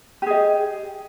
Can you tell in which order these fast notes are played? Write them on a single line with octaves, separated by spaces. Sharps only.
G4 G#4 D#5